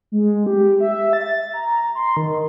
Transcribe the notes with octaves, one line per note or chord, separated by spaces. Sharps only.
G#3
G4
E5
A6
A#5
C6
D#3